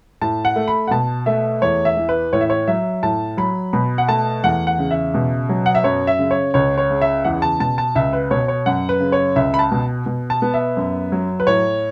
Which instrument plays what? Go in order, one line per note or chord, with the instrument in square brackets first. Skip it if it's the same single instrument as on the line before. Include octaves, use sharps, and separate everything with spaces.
[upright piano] A2 A5
F#5
A3
B5
F#5
B2 A5
A3 E5
E2 C#5
E5
E3
B4
A2 C#5
E5
C#5
F#3 E5
A2 A5
F#3 B5
B2 B5
F#5
A3 A5
E2 F#5
F#5
C#3
E5
B2
F#3
F#5
E5
F#2 C#5
E5
C#3
C#5
C#2 C#5
C#5
C#3
E5
E2 F#5
A5
B2 A5
A5
C#2 E5
B4
B2 C#5
C#5
F#2 F#5
B4
C#3
C#5
C#2 E5
B5
A5
B2
B2
A5
B3
E5
F#2
F#3
B4
A2 C#5